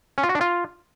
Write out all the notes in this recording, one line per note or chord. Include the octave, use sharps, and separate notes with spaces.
C#4
F4
F#4
D4
F4